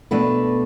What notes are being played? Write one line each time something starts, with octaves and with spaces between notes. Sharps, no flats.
B2 A3 D4 B4